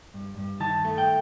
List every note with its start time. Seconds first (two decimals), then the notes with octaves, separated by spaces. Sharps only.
0.14 G2
0.38 G2
0.60 D#3 A5
0.85 A3
0.98 G5